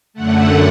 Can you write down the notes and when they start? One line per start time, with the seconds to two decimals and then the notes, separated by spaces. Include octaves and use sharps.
0.14 F#2 D3 A3 F#5